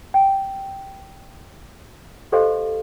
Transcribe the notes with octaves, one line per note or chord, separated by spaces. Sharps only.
G5
G4 A4 C5 D#5 F5 C6